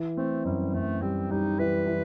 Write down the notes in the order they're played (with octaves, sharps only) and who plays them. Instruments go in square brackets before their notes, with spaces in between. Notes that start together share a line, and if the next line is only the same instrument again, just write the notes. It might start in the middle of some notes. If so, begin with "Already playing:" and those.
Already playing: [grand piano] E3
[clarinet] A3 [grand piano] C4
[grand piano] F#2 [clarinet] G3
[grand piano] F#2 [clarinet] A3
[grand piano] G3 [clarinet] C4
[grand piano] G3 [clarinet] D#4
[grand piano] E3 [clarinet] B4
[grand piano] E3